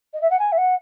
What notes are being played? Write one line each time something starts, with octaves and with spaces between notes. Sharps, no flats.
D#5
E5
F#5
G#5
E5
F#5